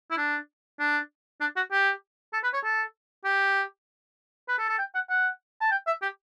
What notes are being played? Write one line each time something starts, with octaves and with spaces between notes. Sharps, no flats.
E4
D4
D4
D4
F#4
G4
A4
B4
C#5
A4
G4
B4
A4
A4
G5
F#5
F#5
A5
G5
E5
G4